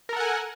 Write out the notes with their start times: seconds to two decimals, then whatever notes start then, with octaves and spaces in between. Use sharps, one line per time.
0.09 A#4
0.13 A4
0.17 F#5
0.20 G#5